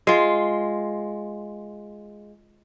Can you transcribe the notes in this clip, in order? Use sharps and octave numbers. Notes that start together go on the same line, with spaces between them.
G#3 F4